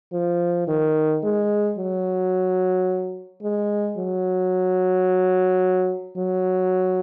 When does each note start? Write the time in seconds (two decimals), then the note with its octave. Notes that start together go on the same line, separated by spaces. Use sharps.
0.13 F3
0.68 D#3
1.23 G#3
1.78 F#3
3.43 G#3
3.98 F#3
6.17 F#3